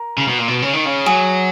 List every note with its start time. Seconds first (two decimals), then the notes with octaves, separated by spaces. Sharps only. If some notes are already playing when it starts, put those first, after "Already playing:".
Already playing: A#4
0.18 C#3
0.28 B2
0.38 A#2
0.48 B2
0.62 C#3
0.73 D#3
0.85 C#3
1.06 F#3 G#4